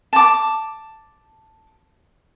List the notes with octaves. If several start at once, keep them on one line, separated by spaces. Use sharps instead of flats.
A5 D6